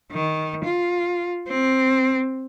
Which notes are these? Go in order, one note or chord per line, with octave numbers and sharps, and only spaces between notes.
D#3
F4
C4